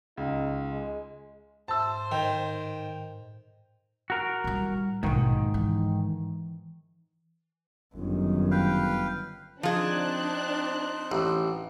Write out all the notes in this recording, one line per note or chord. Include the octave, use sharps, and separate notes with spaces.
C#2 D#4
G#3
G#2 C5 E5 A5 E6
A2 D#3 G5
F#4 A#4
A2 G3
A#1 G#2 B2 D#3
E3
G1 F#2 D#3
B4 F5 G5
F3 C4 D4 D#4 G#4 C5 F#6
A1